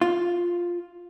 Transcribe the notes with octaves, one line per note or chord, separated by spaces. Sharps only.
F4